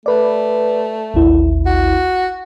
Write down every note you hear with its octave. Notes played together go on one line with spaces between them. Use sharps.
A3 B4 D5
A1 D#2 E4
F#4